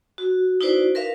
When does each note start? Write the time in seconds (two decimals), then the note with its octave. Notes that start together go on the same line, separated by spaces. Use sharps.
0.18 F#4
0.61 D#4 E4 F#4 B4 C5 D5
0.95 A#4 B4 E5 F5